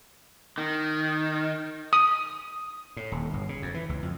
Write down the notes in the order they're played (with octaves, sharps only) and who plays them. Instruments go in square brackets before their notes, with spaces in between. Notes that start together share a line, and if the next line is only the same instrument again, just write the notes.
[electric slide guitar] D#3
[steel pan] D#6
[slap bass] A2
D#1
G1
C#3
F2
E3
C#2
F2